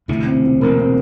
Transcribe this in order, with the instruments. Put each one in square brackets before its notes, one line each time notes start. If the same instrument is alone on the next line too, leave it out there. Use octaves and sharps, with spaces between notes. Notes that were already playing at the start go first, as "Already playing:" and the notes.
[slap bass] E1 D2 C3 [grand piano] E4
[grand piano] C4
C4
[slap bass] E1 D2 C3 [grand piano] A#3
[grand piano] C4